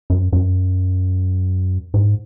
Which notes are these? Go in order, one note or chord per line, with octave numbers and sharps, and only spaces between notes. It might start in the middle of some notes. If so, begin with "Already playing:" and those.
F#2
F#2
G#2